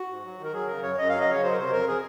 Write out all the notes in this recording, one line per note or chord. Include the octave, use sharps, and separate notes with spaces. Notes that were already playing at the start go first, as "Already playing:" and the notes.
Already playing: F#4
G#2
F#3
D#3
A#4
F#3 G#4
C#3 A#4
F#2 C#5
F#2 D#5
F#3 F5
D#5
C#3 C#5
F#3 C5
A#4
C3 C5
F2 A#4
G#4